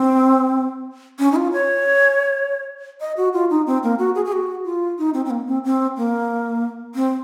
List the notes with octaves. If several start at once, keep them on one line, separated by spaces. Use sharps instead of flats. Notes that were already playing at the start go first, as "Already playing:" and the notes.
Already playing: C4
C#4
D#4
F4
C#5
D#5
F#4
F4
D#4
C4
A#3
F#4
G#4
G#4
F#4
F4
D#4
C4
C4
A#3
C4
C4
A#3
C4